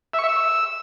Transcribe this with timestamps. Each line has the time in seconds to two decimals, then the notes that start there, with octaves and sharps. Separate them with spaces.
0.14 E5
0.19 C#6
0.24 E5
0.29 E6